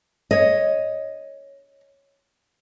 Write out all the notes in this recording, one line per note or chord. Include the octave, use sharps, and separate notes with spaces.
C#5 D#5